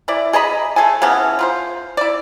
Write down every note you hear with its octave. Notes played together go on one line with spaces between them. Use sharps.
E3 E4 D5
G#4 D#5 A#5 B5
A3 G#4 A4 G#5
C#3 E3 B3 C#4
F4 B4 C5
E4 D5